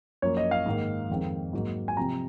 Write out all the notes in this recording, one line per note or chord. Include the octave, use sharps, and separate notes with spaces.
F#2 F3 A#3 C#5
D#5
F5
G#2 D#3 A#3
F2 D#3 G#3 C4
G#2 F#3 A#3
G#5
C3 F3 C4 A#5